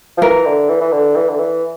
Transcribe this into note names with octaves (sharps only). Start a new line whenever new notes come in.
F3
E3 A#4
D3
E3
E3
D3
E3
D3
E3